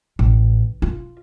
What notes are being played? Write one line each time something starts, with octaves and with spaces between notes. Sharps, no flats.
A1
F4